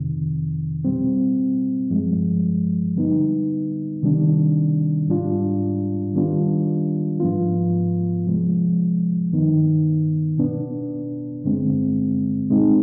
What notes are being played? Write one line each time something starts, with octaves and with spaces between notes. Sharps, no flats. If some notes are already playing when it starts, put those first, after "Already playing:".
Already playing: F2 C3 D#3
B2 G3 C4
G2 F3 G#3
D3 G3 B3 D#4
C3 D#3 G3 D4
G#2 G3 D4 F4
D#3 G3 B3 D4 F4
G#2 F3 B3 F4
C3 F3 G#3
G2 D#3 B3 D#4
B2 B3 D4
G2 D3 G#3 C4
B2 G#3 C4 D#4